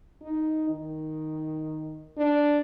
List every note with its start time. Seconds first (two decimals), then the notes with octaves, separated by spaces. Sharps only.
0.22 D#4
0.69 D#3
2.18 D4